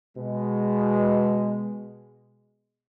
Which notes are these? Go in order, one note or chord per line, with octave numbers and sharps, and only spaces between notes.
B2 G#3